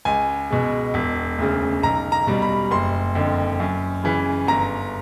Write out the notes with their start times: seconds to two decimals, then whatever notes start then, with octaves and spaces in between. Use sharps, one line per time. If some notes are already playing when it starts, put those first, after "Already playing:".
0.05 C#2 G#5
0.50 B2 G#3
0.94 E1
1.38 D2 C#3
1.83 B1 A#5
2.12 A#5
2.27 B2 G3
2.42 B5
2.71 F#1 C6
3.15 F2 D3
3.60 F#2
4.03 C#3 E3
4.48 G1 A#5